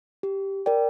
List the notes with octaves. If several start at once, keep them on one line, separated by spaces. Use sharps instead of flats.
G4
A#4 D5 G5